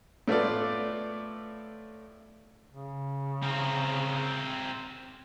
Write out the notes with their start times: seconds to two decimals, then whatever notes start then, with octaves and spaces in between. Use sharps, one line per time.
0.28 A2 A3 B3 F4 D5
2.71 C#3
3.43 C4 A#4